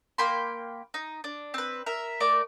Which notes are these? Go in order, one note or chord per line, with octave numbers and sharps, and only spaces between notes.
A#3 G5 B5 C6
D#4
D4
C4 B4
A#4 E5
A3 A#4 D5 D6